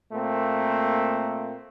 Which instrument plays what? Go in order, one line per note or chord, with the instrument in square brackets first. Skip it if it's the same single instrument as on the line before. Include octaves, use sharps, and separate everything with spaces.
[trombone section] A#2 A3 A#3 C4